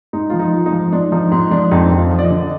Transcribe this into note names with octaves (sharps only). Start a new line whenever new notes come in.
G#2 D#4
F3 F4
D#4
G#2
D#4
F3
G#2 D4
F3 D#4
G#2 D#4
F3 D4
F2 D#4
F2
F4
F3
D5
D#5
D3